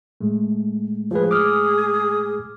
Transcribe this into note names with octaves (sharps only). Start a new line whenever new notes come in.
A2 G#3 A3
F3 G#4 B4
D6 D#6 F6